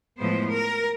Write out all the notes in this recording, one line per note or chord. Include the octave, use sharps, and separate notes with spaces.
A2 F3 G#3 B3 C5
A#4